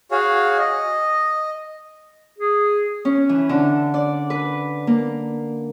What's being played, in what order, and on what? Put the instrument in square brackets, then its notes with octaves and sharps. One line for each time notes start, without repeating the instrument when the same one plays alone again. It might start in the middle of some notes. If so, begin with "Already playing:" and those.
[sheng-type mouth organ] F#4 G#4 C#5 F5
D#5
[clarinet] G#4
[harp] C#4
E3
D3
D5
B4
A#3